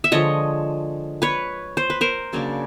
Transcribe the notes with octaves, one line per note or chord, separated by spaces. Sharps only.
E5
D3 F3 G#3 C#5 D#5
B4 C#5
C5
B4
A#4 C5
C#3 F#3 A#3 D4